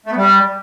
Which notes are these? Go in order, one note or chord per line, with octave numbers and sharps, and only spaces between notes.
A3
B3
G3